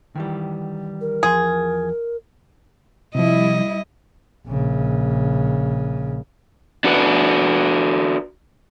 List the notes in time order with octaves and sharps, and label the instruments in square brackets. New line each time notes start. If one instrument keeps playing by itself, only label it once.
[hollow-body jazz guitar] D#3 E3 G3
[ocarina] A#4
[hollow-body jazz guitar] E2 F3 C6 [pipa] G#4
[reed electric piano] C3 F3 [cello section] G3 E4 [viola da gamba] D#5
[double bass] A#1 C#3
[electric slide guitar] D4 F#4 B4